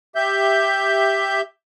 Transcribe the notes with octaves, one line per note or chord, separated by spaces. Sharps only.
G4 E5 G6